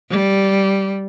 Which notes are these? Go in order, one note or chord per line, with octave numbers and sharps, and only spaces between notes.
G3